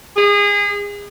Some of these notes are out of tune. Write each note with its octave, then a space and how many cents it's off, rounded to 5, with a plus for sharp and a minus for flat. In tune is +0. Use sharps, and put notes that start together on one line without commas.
G#4 -30